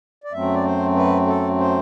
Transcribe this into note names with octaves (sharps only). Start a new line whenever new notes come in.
D5
F#2 F#3 A3 C4 E5
D5
C5
B4
A4
C5